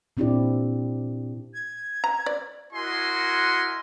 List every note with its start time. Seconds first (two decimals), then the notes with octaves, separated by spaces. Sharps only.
0.17 A#2 C4 D4 E4 G4 D5
1.54 G#6
2.04 A#5
2.26 D5
2.73 E4 F#4 A#4 D#5 G#5 C6